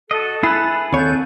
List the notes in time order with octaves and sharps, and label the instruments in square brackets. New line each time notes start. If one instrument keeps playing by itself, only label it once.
[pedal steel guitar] F#4 D#5 [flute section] A4
[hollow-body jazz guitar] E4 [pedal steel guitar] G#4 B4 [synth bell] B5
[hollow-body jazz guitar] D#2 C#5 [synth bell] C4 [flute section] A4 G6